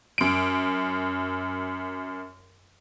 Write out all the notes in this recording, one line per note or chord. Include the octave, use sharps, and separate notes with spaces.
F#2 D7